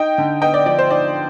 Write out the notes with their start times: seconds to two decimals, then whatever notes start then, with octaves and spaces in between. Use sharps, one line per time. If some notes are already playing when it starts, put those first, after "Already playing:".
Already playing: D#4 D#5 G5
0.18 D3
0.42 B3 D#5 G5
0.54 D5
0.66 F3 D5
0.79 C5
0.90 D#4 D5